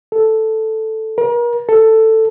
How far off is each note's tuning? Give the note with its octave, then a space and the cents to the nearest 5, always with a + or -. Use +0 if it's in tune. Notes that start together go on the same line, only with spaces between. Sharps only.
A4 +0
A#4 +40
A4 +10